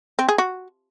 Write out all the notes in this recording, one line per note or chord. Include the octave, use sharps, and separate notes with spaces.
C4
G#4
F#4